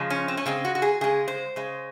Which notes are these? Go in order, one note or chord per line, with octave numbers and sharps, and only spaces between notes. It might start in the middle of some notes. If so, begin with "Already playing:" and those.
Already playing: C#3 F3 G#3
C#4
C4
C#4
C#3 G#3 C4
F#4
F#4
G#4
C#3 G#3 G#4
C5
C#3 G#3